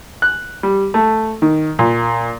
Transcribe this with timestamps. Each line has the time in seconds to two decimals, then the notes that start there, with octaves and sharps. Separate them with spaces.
0.22 F#6
0.63 G3
0.94 A3
1.42 D#3
1.79 A#2